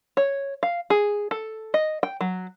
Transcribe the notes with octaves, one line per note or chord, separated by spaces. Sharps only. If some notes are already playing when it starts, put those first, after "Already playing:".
C#5
F5
G#4
A4
D#5
G5
F#3